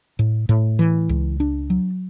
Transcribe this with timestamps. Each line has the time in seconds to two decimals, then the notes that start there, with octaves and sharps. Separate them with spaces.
0.19 A2
0.49 A2
0.79 E3
1.09 C#2
1.40 D4
1.70 F#3